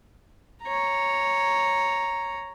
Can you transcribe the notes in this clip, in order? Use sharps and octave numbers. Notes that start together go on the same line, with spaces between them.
C#5 A#5